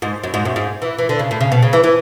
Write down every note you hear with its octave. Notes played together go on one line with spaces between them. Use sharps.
G#2
F#2
G#2
F#2
G#2
E3
E3
D3
C#3
A2
C#3
B2
C#3
E3
E3